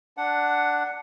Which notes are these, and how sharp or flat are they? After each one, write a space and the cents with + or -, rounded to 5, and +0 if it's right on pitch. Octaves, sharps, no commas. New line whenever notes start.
D4 +0 F#5 +0